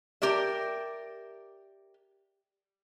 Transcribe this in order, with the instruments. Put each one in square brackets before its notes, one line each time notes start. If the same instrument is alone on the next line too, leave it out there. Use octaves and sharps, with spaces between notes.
[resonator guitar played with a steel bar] G4 A#4 D5 E5